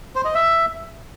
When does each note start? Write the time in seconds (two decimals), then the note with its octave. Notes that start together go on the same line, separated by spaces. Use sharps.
0.15 C5
0.25 D#5
0.34 E5